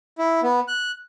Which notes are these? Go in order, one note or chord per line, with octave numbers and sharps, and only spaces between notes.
E4
B3
F#6